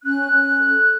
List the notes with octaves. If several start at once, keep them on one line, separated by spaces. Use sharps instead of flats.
C#4 F#6
C#4
A4